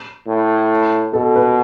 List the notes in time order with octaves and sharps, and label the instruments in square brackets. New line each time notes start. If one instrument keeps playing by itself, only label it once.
[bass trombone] A2
[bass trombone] B2 [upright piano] A4
[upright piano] B4